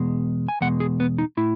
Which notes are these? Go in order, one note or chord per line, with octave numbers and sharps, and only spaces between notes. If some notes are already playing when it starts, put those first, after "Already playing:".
Already playing: E2 B2 G#3
G#5
E2 B2 G#3 F#5
G#4
B3
D#4
A2 E4